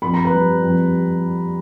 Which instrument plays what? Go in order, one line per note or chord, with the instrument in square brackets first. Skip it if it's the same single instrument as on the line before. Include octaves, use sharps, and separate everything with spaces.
[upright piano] F2 B5
A#5
B4 B5
G3
F2